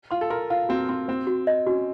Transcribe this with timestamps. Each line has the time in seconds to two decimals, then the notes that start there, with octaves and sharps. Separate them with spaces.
0.11 F4 C6
0.21 A4
0.30 A#4 C6
0.50 F4 F5
0.69 C4 F#4
0.89 C4 C6
1.08 C4 C5
1.27 F#4
1.47 D#5
1.67 C#4 F#4